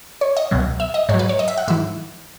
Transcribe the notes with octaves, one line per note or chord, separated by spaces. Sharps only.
C#5
D#5
C#2 B2 F#3
E5
D#5
G#2 C#5
F#3
B4
C#5
D#5
E5
F#5
G#2 E3 E5